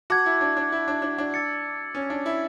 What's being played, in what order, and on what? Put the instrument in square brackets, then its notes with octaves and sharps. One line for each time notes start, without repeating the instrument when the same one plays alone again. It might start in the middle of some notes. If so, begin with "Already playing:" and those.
[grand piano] F#4 [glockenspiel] A5 D6 G#6
[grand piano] E4
D4
D4
E4
D4
D4
D4
[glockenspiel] E6 A6 C#7
[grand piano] C#4
D4
E4